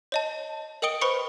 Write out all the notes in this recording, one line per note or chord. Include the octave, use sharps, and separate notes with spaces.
C#5 D#5 A5
A#4 D#5 G5 D#6 D7 G7
B4 C5 B5 C#6 C#7